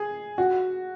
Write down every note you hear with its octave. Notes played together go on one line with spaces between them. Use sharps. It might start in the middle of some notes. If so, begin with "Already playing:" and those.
Already playing: G#4
F#4